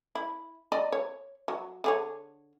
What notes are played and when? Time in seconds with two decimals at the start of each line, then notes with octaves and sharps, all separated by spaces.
0.15 E4
0.72 D5 D#5
0.92 C#5
1.48 F#3
1.84 D3 G#4 C#5